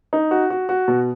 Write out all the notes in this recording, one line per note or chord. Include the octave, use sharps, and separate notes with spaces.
D#4
F#4
F#4
F#4
B2